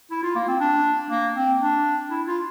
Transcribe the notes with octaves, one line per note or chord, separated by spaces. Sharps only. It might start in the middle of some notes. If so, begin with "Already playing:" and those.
E4
F4
A#3
C4
D4
A#3
C4
D4
E4
F4